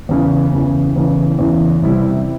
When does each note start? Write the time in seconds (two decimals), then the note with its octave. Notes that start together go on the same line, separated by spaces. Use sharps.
0.09 E2 C#3 E3
0.53 E2 C#3 E3
0.96 E2 C#3 E3
1.39 E2 C#3 E3
1.82 C3 G3 C4 E4